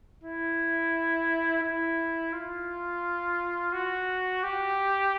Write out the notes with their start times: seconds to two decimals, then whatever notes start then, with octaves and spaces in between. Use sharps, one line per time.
0.23 E4
1.63 E4
2.33 F4
3.73 F#4
4.43 G4